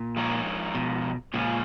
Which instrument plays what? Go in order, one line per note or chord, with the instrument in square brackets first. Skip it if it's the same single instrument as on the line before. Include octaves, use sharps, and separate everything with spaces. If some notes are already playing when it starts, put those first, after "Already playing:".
Already playing: [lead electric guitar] A#2
[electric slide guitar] F3 G#3 D#4 A#4 C#5
[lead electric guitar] B2
[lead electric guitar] A#2 [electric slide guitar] C#3 F3 G#3 C#4